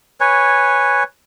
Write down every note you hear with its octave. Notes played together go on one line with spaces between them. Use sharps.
B4 C#5 G#5